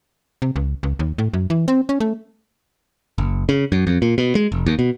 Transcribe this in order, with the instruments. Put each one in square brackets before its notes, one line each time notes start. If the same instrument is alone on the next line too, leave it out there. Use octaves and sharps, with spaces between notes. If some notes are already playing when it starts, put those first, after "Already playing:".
[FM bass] C3
C#2
C#2
D#2
A2
F#2
E3
C4
C#4
A3
[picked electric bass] F#1
C#3
F#2
F2
A#2
B2
G#3
F1
D#2
B2